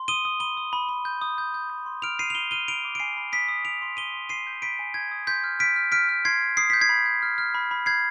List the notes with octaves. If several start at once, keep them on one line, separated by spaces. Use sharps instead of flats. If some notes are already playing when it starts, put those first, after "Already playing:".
Already playing: C6
D#6 D#7 G7
D#6
B5 D#7 G7
D#6
B5
B5
G6
D#6
G6
G6
G6
C6
F6 D7 F7
B5 C7 D#7
F7
B5 D#7 G7
F6 D#7 G7
B5 D7 F7
D6
D7
G#5 C7 D#7
B5
D#6 B6 D7
D#6
D#6 D7 F7
C6
D#6 D#7 G7
C6
C6 C7 D#7
G6
B5 B6 D7
G#5
G6 G#6
D#6
C6 G6 B6
F6
F6 B6 D7
F6
F6 B6 D7
F6
C6 G#6 C7
F6
D#6 C7
G6 B6
G#6 C7
B5
G6
F6
F6
B5
B5
G6 G#6 C7